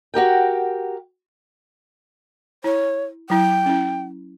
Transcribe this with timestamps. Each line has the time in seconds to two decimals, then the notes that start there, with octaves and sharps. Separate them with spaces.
0.14 F#4 G4 A#4 G5
2.64 E4 C#5
3.30 F#3 E4 G5
3.66 C#4 E4